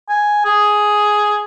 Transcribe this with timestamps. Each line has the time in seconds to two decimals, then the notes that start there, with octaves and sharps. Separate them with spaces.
0.09 G#5
0.45 G#4